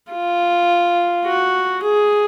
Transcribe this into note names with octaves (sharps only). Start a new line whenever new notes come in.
F4
F#4
G#4